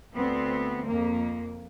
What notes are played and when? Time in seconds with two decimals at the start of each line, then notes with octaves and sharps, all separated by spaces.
0.15 D2 B3 C4
0.87 F2 A#3